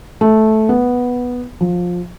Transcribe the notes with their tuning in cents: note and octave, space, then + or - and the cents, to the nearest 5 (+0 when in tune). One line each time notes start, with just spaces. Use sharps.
A3 -10
B3 -5
F3 +20